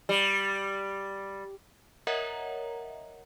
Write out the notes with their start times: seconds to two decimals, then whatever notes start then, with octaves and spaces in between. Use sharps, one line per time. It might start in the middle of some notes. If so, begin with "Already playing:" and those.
0.09 G3
2.07 A#4 C#5 D#5 E5 F#5 A#5